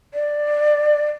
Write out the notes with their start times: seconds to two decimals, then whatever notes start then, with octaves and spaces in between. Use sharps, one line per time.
0.14 D5